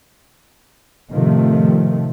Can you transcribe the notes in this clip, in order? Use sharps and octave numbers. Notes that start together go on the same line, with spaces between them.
A2 C3 D#3 F3 A3